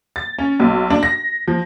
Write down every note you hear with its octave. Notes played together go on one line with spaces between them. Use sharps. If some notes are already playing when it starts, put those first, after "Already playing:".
A6
C#4
B1
D4
A#6
F3